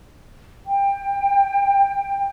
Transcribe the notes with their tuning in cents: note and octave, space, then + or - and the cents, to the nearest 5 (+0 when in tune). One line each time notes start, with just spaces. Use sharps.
G5 +20